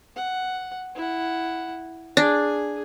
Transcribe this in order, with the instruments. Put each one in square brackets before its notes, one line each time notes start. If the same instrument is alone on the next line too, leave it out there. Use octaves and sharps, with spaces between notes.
[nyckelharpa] F#5
E4 F#5
[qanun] D4 [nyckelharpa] G#4 G#5